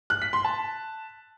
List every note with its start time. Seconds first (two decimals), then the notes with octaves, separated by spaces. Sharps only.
0.10 F#6
0.22 B6
0.33 C6
0.45 A5